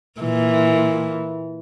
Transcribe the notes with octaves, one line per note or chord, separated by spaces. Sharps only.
A#2 E3